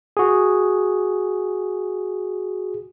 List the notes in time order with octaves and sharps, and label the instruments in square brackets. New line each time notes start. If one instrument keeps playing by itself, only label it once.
[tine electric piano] F#4 G#4